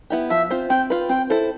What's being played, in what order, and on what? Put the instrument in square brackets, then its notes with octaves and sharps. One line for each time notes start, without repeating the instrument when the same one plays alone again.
[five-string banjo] B3 E4 G4
[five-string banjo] F3 [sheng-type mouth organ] E5
[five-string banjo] C4 F4 C5
[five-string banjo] C4 [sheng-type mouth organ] G5
[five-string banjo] F4 B4
[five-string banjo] C4 [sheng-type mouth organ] G5
[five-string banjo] E4 A4 C5